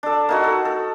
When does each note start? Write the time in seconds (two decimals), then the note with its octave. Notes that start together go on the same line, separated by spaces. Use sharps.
0.03 D4 A4
0.29 A#3 D#4 F#4
0.44 A4
0.65 A4